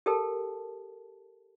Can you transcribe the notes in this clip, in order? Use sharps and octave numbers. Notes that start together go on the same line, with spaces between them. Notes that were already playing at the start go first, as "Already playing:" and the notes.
G4 A4 A#4 G5 A5